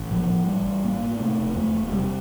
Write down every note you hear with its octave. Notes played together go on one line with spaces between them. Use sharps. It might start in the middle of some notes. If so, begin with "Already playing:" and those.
Already playing: A1
A2 F3
A2
A1 G3
A1
A2 A#3
A2
C3 A3
E1
E2 A3
E1
A3
C3 G3